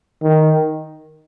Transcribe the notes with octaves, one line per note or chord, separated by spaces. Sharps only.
D#3